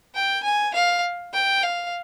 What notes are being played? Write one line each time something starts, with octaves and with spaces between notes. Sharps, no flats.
G5
G#5
F5
G5
F5